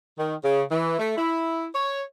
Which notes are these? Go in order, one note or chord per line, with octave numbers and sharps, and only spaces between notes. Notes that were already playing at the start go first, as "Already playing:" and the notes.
D#3
C#3
E3
A3
E4
C#5